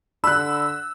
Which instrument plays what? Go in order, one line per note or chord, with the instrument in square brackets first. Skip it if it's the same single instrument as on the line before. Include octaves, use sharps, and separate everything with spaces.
[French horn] D3 [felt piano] B5 F#6 [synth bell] E6